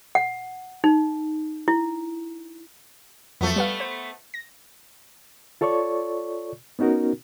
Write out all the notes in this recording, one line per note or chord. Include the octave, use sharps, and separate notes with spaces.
F#5
D#4
E4
F2 F3 F#3 A3 B3
G3 B4 F5
C5
A#6
F4 A4 C#5 D5 C#6
B3 C#4 D#4 F#4 A#4